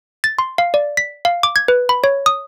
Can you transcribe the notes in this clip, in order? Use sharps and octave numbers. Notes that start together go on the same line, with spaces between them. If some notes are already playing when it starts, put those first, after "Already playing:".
A6
C6
F5
D5
B6
F5
D6
G#6
B4
B5
C#5
D#6